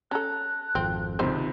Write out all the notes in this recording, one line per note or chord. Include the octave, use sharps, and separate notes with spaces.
C#4 A4 A5 A#5 F#6
G#1 F2 C4
C#2 C3 D#3 C4 D#4 C5